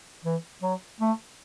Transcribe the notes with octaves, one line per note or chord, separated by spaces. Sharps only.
E3
F#3
A3